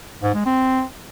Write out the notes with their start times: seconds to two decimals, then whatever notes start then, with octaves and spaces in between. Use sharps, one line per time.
0.23 G#2
0.34 G#3
0.46 C4